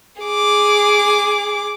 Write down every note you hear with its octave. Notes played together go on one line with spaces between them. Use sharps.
G#4 D6